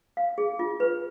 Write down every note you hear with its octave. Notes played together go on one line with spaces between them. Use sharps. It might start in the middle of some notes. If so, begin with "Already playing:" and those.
F5
G#4
F4
B4